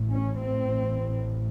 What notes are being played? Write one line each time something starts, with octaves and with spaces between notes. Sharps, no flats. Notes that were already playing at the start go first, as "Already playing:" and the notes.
Already playing: A1 A2
C#4
C4